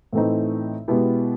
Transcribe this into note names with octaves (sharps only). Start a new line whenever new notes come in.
A2 E3 A3 C4 D#4
B2 G#3 B3 E4 G4